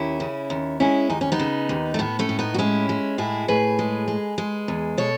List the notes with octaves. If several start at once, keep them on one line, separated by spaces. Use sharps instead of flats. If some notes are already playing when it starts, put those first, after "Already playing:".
Already playing: D#2 C#4 E4
C#3
D#2
G#3 C#4 E4
D#2 D#4
C#4
B3 D#4
C#3
D#2
A3
A2 B3
A3 C#4
A2
B3 D#4
F#4
G#3 C#4 E4
G#3
A2 E4 G#4
A2 G#4 B4
G#3
G#3
G#3
E2
B2 A4 C#5